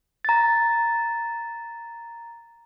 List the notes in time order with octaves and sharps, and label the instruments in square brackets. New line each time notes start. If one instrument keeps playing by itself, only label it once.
[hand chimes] A#5 A6